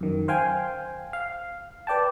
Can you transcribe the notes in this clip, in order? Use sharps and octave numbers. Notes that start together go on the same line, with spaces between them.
F#2 D#3
C5 F5 G5 G#5
F5
B4 D5 G5 A5